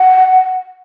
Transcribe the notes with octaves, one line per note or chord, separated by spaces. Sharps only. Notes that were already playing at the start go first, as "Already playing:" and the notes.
Already playing: F#5